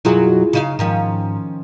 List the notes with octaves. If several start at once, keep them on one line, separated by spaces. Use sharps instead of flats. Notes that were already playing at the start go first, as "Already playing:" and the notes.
F#2 B2 F#3 E4 F4 G#4
C#3 D#4 F5
G#2 D#3 F3 C#4 A#5